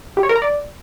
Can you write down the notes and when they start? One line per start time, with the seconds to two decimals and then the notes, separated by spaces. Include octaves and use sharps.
0.17 G4
0.23 C#5
0.29 A#4
0.36 A#5
0.42 D5